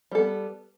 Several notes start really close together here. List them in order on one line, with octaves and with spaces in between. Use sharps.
G3 A4 B3